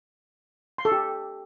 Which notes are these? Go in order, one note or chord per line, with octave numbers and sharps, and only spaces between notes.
C6
A4
G4